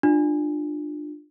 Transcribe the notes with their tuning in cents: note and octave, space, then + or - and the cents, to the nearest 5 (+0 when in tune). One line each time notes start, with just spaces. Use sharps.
D4 +25 F4 +10